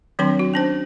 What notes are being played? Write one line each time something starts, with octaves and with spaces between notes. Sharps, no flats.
D#3 F#3 C4 D4 C6
F#4
C#4 D4 C5